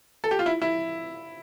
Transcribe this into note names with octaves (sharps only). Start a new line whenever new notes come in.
A4
G4
F4
E4
E4